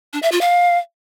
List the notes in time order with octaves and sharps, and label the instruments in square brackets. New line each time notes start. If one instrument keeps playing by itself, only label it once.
[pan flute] D4
E5
F4
F5